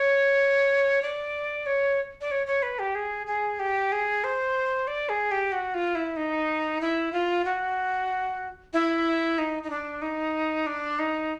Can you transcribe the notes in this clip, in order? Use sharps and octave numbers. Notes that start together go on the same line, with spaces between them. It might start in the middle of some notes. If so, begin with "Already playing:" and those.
Already playing: C#5
D5
C#5
D5
C#5
C#5
B4
G4
G#4
G#4
G4
G#4
C5
D5
G#4
G4
F#4
F4
E4
D#4
E4
F4
F#4
E4
D#4
D#4
D4
D#4
D4
D#4